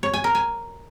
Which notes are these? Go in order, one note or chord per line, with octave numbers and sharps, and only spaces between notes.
C#5
G#5
A#4
G#5